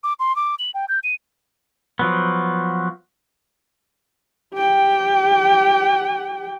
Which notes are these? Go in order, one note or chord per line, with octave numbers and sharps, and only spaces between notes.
D6
C6
D6
F#7
G5
G6
D#7
F3 F#3 B3
G4 G5